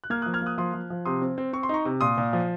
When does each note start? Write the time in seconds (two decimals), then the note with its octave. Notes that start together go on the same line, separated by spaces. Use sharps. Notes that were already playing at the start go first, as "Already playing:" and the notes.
0.04 F#6
0.10 A#3 F6 G#6
0.22 D#6 F#6
0.26 F3
0.34 F6 G#6
0.42 A#3 D#6 F#6
0.58 F3 C6 D#6
0.74 F3
0.90 F3
1.05 C3 C6 D#6
1.22 C4
1.38 C4
1.53 C4 C#6
1.63 C6
1.69 D#4 A#5 C#6
1.85 C3
2.01 A#2 C6 D#6
2.18 A#2
2.33 F3